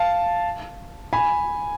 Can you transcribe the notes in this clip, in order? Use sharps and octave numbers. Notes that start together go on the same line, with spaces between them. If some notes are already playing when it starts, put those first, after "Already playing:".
Already playing: F5 A5
G#5 B5